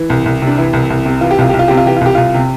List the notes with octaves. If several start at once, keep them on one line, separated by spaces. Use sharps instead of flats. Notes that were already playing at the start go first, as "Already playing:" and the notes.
Already playing: E3
C2
C2
C3
D4
E3 E4
C2
C2
C3
E3 F4
G4
C2 F4
C2 G4
F4
C3 G4
F4
E3 G4
F4
C2 G4
C2 F4
C3